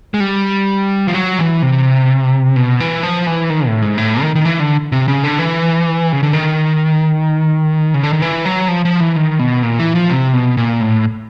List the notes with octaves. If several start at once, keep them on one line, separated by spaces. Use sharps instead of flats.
G#3
G3
F3
F#3
E3
C3
B2
E3
F3
E3
D#3
A2
G#2
A2
D#3
D#3
E3
D3
C3
C#3
D3
E3
C#3
D3
D#3
C#3
D3
D#3
E3
F#3
F3
F3
E3
D#3
B2
A#2
E3
F3
C3
B2
A#2
A2